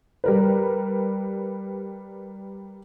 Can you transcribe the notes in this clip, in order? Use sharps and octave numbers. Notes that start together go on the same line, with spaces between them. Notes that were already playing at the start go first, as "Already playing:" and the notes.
G3 A#4 B4